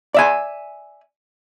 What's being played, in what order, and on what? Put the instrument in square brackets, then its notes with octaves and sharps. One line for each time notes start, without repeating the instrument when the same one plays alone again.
[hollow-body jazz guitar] D5 E5 G#5